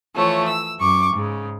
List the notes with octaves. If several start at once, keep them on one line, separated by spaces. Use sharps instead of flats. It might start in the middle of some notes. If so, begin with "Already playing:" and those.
E3 F3 A3 C#5
E6
F#2 C#6 D6
G#2 C#3